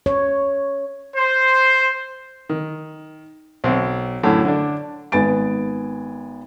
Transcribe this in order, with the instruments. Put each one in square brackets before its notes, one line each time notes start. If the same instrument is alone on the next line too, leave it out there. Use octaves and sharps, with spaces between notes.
[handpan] C#5
[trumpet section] C5
[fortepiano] D#3
B1 C4
F#2 A2 D3
D3 D4
[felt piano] G#1 B3 G#5 A6 D7